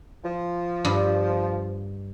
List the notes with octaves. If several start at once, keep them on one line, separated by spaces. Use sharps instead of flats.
F3
G2